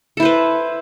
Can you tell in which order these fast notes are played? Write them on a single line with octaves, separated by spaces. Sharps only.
A4 E4 C5 B4